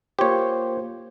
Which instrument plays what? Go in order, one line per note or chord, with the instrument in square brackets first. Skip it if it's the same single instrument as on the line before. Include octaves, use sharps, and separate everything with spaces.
[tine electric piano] A#3 F4 C5 [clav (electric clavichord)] G4 C#5